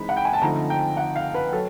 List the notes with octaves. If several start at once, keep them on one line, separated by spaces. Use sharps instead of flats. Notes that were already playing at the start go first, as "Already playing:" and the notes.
Already playing: E3 G#3 C4 D#4 B5
F#5
G5
G#5
A5
D3 F3 A3 C4 D#4 A#5
G5
F#5
F5
B4
F#3 A4